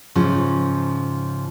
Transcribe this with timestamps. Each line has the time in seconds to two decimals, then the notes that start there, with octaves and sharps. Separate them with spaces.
0.15 G#2 C#3 F3 C#4